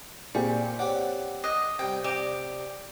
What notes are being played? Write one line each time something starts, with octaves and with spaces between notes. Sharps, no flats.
A#2 C4 G4 G#4 D5 G#5
C4 G4 C#5 D5 F#5
D#5 D6 F#6
C3 G3 G5
C3 G4 D5 D#5